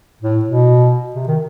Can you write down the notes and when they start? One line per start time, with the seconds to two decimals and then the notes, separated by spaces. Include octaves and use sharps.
0.21 A2
0.45 B2
1.15 C3
1.27 D#3